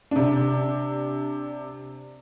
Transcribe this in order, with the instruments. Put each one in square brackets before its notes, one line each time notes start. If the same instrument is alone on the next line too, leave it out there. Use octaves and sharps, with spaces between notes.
[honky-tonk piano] C3 D4